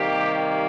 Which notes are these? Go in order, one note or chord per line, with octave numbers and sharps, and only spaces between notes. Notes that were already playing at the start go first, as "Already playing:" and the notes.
Already playing: C3 D#3 G3 A#3 G4